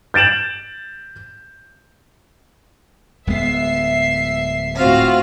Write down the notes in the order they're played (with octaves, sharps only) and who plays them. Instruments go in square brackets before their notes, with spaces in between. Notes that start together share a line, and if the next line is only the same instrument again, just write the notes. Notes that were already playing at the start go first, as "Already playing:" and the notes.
[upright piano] G6 A6 D7 E7 F#7
[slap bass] D1 G#3 B3 [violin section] E5 C7
[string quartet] A2 F4 F5 [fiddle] C4 F#4